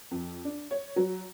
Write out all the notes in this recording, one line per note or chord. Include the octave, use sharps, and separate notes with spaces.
F2
D4
C#5
F#3